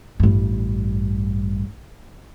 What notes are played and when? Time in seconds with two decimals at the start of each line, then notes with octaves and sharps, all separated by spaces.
0.20 A1 G2